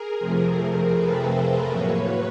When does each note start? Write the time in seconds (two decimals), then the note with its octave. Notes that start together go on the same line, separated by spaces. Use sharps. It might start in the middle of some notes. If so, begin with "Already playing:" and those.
Already playing: G#4 A#4
0.19 F2 C3 F3 A3 C4
0.94 A4 B4
1.31 A#4 C5
1.69 A2 F#3 A#3 B4 C#5